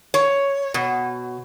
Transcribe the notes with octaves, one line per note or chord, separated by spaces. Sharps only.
C#5
B2